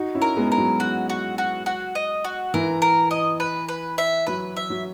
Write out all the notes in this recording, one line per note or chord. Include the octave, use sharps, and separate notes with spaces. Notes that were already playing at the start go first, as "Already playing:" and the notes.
Already playing: D#4 F#4
C#4 E4
A#4
G#3 B3
A#4
F#3
F#4
F#4
F#4
F#4
D#5
F#4
E3 A#4
A#4
D#5
B4
B4
E5
F#3 B4
E5
F#3